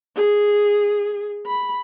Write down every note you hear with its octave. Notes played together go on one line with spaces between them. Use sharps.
G#4
B5